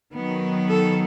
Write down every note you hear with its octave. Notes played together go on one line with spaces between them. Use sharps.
D#3 F#3 B3
A4